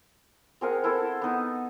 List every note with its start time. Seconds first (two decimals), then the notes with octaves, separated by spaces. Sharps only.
0.61 C4 G#4 A#4 F#5
0.84 E4 A4 C5
1.22 B3 D#4